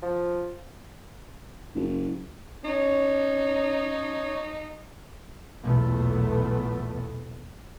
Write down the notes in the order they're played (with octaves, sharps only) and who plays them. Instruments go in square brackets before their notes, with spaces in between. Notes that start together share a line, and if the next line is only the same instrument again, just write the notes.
[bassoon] F3
[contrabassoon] F#1
[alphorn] C#4 [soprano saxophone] D#4 [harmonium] C#5
[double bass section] B1 E2 A#2 A3 B3